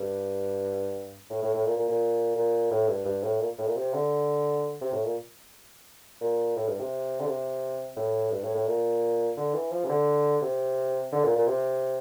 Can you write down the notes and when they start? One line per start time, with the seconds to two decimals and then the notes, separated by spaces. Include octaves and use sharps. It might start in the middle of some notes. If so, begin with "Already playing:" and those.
Already playing: G2
1.30 A2
1.42 A2
1.54 A2
1.65 A#2
1.77 A#2
1.89 A#2
2.36 A#2
2.71 A2
2.88 G2
3.05 G2
3.23 A2
3.40 A#2
3.58 A2
3.67 A#2
3.76 C3
3.94 D3
4.81 C3
4.93 A2
5.04 A#2
6.21 A#2
6.56 A2
6.68 G2
6.80 C3
7.20 D3
7.27 C3
7.96 A2
8.32 G2
8.43 A2
8.55 A2
8.67 A#2
9.37 D3
9.55 E3
9.72 F3
9.85 C3
9.89 D3
10.42 C3
11.12 D3
11.24 A#2
11.36 A#2
11.47 C3